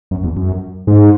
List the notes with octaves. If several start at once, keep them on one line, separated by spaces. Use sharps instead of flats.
F#2
E2
F#2
G#2